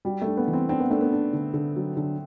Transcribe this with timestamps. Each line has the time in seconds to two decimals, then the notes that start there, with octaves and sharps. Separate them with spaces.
0.05 G3 F#4
0.21 A3
0.27 D4
0.37 B3
0.48 E3
0.53 C4
0.69 C4 D4
0.80 B3
0.90 A3 D4
1.01 B3
1.12 D4
1.33 D3
1.54 D3
1.76 F#3
1.97 D3